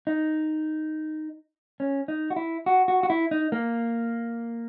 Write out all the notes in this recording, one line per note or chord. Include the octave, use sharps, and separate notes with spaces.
D#4
C#4
D#4
F#4
E4
F#4
F#4
F#4
E4
D#4
A#3